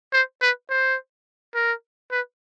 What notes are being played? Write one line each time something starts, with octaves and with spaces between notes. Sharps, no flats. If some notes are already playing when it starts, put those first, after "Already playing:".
C5
B4
C5
A#4
B4